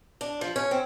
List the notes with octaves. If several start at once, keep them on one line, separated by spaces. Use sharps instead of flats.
D4
F3
C#4
C4